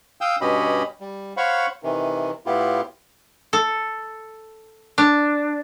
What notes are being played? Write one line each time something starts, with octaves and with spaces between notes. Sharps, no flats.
F5 G5 D#6 E6 G6
G2 B2 C#4 G4 D#5 B5
G3
C5 C#5 F5 F#5 B5 C#6
C3 D#3 E3
A2 B3 E4 F4 G4
A4
D4